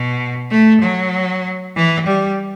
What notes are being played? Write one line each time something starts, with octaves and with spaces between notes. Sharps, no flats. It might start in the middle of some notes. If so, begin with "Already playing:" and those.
Already playing: B2
A3
F#3
E3
G3